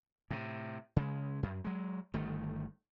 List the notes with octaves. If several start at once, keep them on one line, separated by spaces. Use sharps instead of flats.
A2 C3
C#3 G#3
F#2
F#3 G#3
G1 D#3 A3